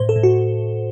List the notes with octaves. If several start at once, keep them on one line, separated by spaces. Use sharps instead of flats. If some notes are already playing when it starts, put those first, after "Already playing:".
Already playing: A2 C5
A4
A2
F#4